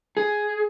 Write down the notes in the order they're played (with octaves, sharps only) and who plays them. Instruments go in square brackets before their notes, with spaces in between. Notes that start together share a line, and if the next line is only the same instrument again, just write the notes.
[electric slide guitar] G#4